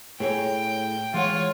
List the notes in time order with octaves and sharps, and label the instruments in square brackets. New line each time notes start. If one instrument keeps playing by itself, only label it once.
[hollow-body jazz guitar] A2 G#4 C#5 [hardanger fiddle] G5
[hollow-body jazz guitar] E3 G#3 F#5 [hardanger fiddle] F4 C#5